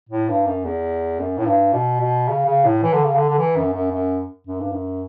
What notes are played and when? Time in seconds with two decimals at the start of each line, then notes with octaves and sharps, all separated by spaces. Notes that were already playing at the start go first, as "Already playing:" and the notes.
0.09 A2
0.29 G2
0.46 F#2
0.65 E2
1.20 F#2
1.38 A2
1.46 G2
1.73 B2
2.01 B2
2.29 C#3
2.46 C#3
2.65 A2
2.83 E3
2.93 D3
3.04 C#3
3.16 D3
3.29 D3
3.38 E3
3.56 F#2
3.73 F#2
3.92 F#2
4.47 F#2
4.60 G2
4.72 F#2